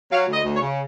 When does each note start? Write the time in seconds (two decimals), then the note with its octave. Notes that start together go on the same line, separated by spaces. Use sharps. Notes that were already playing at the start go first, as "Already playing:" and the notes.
0.11 F#3 F5
0.28 D2
0.33 D#5
0.44 D2
0.55 C#5
0.61 C#3